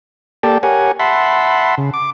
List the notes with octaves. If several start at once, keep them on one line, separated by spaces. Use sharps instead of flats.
A#3 G4 A4 D5 G5 A5
G4 A#4 C#5 F#5 G#5
E5 F#5 A5 B5 C6
C#3
D6